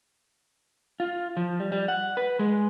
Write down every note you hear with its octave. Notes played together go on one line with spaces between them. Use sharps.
F4
F3
G3
G3
F#5
B4
G#3